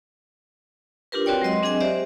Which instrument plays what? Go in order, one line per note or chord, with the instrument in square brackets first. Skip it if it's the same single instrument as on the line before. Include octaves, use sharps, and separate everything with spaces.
[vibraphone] D4 F4 G4 A#4 B4
C4 F#4 B4 C#5 D5 G5
F#3 G#3 D#5 C6
C4 D4 G#4 D#5 G#5
G4 C5 D5 E5